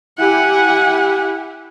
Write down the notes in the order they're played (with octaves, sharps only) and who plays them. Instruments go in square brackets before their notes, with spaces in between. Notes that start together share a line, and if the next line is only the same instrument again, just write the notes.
[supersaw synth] E4 G4 [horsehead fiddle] F#5 G#5